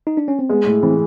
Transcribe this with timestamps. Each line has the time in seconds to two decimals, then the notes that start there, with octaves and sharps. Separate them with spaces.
0.07 D#4
0.17 D4
0.28 C#4
0.39 C4
0.49 G#3 B3
0.66 A2
0.83 E3 C4